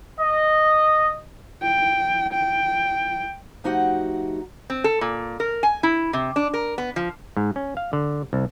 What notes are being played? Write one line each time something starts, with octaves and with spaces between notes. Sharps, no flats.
D#5
G5
G5
F3 A3 D#4 F#4 G4 F#5
C4
A4
A#2
A#4
G#5
E4
C3
D4
A#4
B3
F3
G#2
C#4
F5
D3
C2